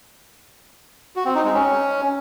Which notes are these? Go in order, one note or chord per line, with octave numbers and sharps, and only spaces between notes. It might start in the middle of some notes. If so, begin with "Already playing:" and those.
F#4
C4
D#4
G#3
C#4